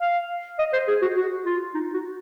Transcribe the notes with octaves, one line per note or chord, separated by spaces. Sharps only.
F5
D#5
C5
G#4
F#4
F#4
F4
D#4
F#4